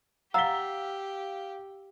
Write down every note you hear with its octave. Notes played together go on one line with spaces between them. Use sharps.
G4 D#5 F5 F#5 A#5 E6 B6 G7